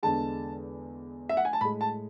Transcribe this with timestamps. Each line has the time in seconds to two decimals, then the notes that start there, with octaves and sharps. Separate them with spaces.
0.03 E2 D3 G#3 A5
1.29 E5
1.37 F#5
1.45 G#5
1.53 A5
1.61 A2 G#3 B5
1.81 A5